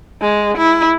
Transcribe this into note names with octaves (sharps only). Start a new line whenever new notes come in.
G#3
E4